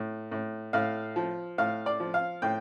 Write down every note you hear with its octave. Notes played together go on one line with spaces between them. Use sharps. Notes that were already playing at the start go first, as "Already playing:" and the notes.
Already playing: A2
A2
A2 F5
F3
A2 F5
D5
F3
F5
A2 G5